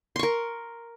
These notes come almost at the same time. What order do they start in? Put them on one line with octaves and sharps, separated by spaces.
C6 C#6 A#4